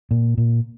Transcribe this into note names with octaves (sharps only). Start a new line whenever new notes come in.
A#2
A#2